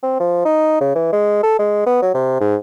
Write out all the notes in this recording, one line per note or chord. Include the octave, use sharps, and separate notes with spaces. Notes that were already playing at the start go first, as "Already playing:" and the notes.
C4
F3
D#4
C#3
E3
G#3
A4
G#3
B3
F#3
C3
G#2